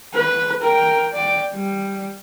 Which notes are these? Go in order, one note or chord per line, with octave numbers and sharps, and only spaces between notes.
B4
A#4 G5
D5 G5
G3